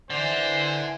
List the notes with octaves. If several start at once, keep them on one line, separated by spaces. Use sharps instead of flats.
D3 E3 C5 G#5